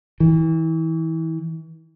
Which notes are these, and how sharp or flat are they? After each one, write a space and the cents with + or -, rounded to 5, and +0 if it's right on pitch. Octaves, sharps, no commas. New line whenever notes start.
E3 -30